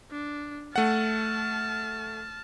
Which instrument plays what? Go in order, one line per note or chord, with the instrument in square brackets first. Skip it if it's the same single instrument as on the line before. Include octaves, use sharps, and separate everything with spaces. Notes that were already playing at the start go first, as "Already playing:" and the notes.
[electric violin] D4
[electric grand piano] A3 F#5 [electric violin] A5 F6